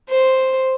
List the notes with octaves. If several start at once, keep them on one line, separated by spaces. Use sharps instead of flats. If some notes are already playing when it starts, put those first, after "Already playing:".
C5